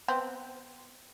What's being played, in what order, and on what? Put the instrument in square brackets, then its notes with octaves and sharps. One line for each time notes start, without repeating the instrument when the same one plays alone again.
[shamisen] B3 C4